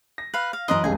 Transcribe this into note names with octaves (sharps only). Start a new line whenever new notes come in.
A#6
B4 F5
F5
F#2 E3 A#4 B4 D#5 C6
F1 C#2 G2 G#4 G#5